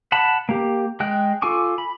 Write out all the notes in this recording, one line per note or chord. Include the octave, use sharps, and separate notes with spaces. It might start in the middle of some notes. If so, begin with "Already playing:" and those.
F#5 A5 B5
A#3 G4
G#3 G5 F#6
F4 A4 G#5 C#6 D6
B5